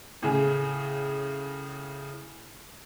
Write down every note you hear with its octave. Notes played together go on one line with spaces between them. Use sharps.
A2 C#3 G#4